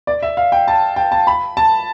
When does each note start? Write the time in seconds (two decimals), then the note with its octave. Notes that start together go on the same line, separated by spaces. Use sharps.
0.07 D5
0.23 E5
0.37 F5
0.52 G5
0.68 A5
0.96 G5
1.12 A5
1.27 B5
1.57 A5